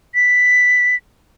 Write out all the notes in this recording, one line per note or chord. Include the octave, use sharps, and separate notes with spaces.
B6